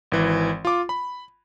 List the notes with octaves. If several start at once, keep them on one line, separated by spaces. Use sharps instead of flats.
G#1 E3
F4 D6
B5